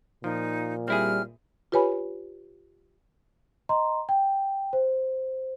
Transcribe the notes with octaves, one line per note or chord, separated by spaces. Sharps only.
A#2 F3 D#4
G3 C4 E4 G#4 F6
F4 G4 B4 C#5 G#5 B5
D#5 A#5 C6
G5
C5